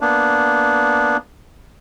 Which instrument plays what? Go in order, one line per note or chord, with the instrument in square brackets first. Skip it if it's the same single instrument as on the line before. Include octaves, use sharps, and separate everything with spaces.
[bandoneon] A#3 B3 D4